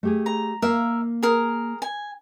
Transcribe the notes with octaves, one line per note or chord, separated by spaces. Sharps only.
A3 G4 G#4
A#5
A#3 A#4 E5 F5
G#4 A#4
G#5